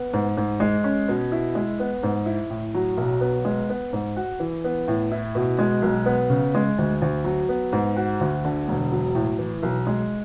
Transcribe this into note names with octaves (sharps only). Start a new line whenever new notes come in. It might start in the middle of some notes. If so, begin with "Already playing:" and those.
Already playing: B3
G#2
G#2
G#3
C#4
B2
E4
G#3
B3
G#2
E4
A2
F#3
B1
B3
G#3
B3
G#2
F#4
E3
B3
A2
E4
B2
G#3
B1
B3
C#3
G#3
D2
D2
F#3
B3
G#2
F#4
D2
D3
E1
F#3
A2
E3
B1
G#3